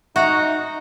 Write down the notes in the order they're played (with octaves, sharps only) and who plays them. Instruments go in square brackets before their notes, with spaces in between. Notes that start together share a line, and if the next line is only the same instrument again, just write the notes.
[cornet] D#4 [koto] F#4 F#5 A#5 [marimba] E5 C#6